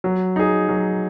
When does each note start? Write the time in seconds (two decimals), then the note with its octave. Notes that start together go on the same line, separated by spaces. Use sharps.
0.04 F#3
0.36 D#4 G#4
0.69 F#3